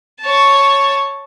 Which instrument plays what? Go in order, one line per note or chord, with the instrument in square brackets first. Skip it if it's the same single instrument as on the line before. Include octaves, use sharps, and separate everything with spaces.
[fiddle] C#5 A5